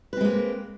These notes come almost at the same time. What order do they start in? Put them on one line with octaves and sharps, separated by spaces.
B4 C4 G#3 A#3